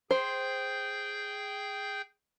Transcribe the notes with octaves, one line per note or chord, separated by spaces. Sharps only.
G#4 C5 G5 G6